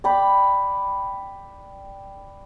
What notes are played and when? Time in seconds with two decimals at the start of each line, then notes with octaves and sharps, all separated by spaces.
0.04 D5 G5 B5